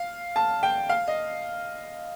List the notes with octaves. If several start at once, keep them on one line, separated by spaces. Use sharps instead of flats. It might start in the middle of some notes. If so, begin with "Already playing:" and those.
Already playing: F5
A5
G5
F5
D#5